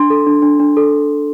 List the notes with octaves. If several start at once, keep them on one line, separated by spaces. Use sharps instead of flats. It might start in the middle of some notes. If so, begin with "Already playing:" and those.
Already playing: D4 C6
A4
D4
D4
D4
A4